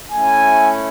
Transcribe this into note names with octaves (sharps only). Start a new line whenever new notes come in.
A3 C#4 E4 G#5